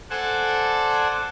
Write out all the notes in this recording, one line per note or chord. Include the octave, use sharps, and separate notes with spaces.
A4 C5 D5 F#5 G#5 A5